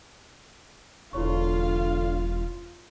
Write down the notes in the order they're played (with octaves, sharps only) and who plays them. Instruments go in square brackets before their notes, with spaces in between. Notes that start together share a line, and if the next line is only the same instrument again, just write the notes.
[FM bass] E1 [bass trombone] D3 [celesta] E4 C#5 C#6 [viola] F4 F5